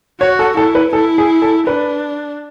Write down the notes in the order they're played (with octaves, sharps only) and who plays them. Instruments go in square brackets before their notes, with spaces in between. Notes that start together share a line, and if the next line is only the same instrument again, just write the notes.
[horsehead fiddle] F#4 [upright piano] C#5
[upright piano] A4
[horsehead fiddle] E4 [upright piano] A4
[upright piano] B4
[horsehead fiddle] E4 [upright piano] A4
[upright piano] G#4
A4
[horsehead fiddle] D4 [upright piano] B4